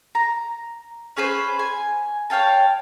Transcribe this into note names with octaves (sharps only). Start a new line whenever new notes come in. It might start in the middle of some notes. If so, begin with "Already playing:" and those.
A#5
C#4 G#4 B4 C5
G#5
C#5 F5 G5 A5